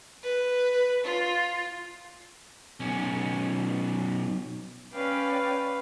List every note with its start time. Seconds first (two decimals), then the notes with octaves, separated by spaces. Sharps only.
0.23 B4
1.04 F4
2.80 B1 C#4
4.92 C#4 B4 D5 F5 G5